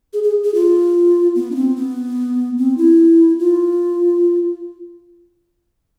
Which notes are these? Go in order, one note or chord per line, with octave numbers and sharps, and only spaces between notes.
G#4
G#4
G#4
F4
B3
D4
C4
B3
C4
E4
F4